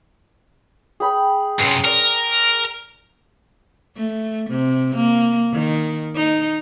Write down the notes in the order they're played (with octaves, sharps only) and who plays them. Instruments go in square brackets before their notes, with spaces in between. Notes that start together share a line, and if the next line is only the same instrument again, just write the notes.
[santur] G#4 G5 B5
[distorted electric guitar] F#2 C3 [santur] C#4 C5
[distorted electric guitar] A#4 [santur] D5
[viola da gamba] A3
C3
A#3
D#3
D#4